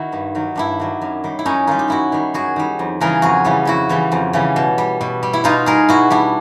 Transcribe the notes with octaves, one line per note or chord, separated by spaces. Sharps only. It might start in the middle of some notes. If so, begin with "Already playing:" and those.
Already playing: D#3 E4 F#4
G2
D#3 F#3
G2 D4 E4
D#3 F#3
F#2
D#3 G3
E4
F#2 C#4 D#4
D#3 G3 D#4 F4
G4
F#2 E4 F#4
D#3 G3
F#2 F#4 G#4
D#3 G3
F2
C#3 E3 G3 G#4 A#4
F2 F#4 G#4
C#3 E3 G3
F2 E4 F#4
C#3 E3 G3
F2
C#3 E3 G3
B2
G3
B2
G3
E4
B2 D#4 F4
G3 G#4 A#4
B2 E4 F#4
G3 D4 E4